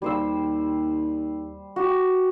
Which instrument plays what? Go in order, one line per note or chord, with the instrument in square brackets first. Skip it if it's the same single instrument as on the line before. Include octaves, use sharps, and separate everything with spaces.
[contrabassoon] D#2 [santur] G3 C5 E6
[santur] F#4 G4